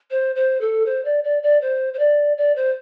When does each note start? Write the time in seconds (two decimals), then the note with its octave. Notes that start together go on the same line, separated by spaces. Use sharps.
0.11 C5
0.35 C5
0.61 A4
0.86 C5
1.05 D5
1.24 D5
1.43 D5
1.61 C5
1.93 C5
1.99 D5
2.37 D5
2.56 C5